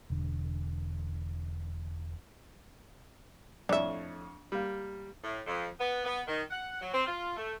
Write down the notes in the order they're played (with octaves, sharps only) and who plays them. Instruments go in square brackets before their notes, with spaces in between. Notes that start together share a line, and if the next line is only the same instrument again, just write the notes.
[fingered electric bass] E1 D3
[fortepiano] F2 A2 [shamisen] D4 E5
[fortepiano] G3 A#3
[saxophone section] A2
F2
B3
B3
D#3
F#5
F#3
C4
F4
A3